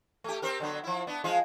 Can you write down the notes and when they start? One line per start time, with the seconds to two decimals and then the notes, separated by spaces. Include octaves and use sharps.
0.24 A3 G4
0.42 C4 G4 A#4
0.60 D3 F#3 B3
0.84 F3 E4
1.07 B3 D4
1.24 F3 G#3 F4